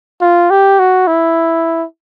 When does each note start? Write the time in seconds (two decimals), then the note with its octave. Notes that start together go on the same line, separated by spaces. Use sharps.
0.21 F4
0.50 G4
0.79 F#4
1.07 E4